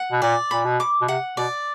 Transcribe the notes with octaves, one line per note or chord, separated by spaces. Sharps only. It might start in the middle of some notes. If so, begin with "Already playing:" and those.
Already playing: F#5
B2
A#2 D5
A#2 B5
B2
D6
B2
C3 F#5
B2 D5